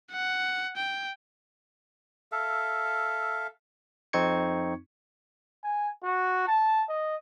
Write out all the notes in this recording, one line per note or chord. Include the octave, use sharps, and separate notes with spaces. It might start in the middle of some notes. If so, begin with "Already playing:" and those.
F#5
G5
A4 E5 F5
F2 C4 D#4 C#6 G#6 C#7
G#5
F#4
A5
D#5